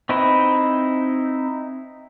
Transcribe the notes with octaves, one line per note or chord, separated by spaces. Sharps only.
C4 D#4 E4 B4